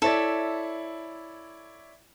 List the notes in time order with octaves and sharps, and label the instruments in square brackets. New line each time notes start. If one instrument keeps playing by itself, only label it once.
[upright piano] E4 C#5 D5 [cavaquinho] A4 E5